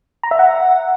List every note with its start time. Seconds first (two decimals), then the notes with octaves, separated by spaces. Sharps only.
0.23 A#5
0.31 E5
0.39 F#5